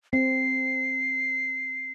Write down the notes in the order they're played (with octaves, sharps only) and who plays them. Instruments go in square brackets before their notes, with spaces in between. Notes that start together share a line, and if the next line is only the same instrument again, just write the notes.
[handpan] C4 [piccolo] C7